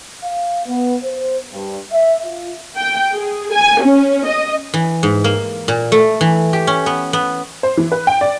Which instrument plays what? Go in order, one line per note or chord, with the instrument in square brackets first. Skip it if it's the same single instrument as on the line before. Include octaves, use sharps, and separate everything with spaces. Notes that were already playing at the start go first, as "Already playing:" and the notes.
[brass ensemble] F5
B3
C5
G2
E5
F4
[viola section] G5
G#4
G#5
C#4
D#5
[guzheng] E3
G#2
A#3
A#2
A3
E3
G4
C#4
B3
B3
[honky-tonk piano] C5
E3
B4
G5
D5